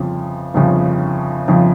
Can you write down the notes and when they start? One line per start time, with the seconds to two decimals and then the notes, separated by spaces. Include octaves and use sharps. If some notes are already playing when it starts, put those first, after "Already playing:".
Already playing: G1 F2 C#3 F3
0.54 G1 F2 C#3 F3
1.48 G1 F2 C#3 F3